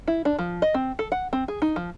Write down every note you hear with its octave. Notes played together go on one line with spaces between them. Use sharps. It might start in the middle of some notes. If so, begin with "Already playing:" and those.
E4
D4
F3
D#5
C4
A4
F#5
C4
G#4
D#4
F3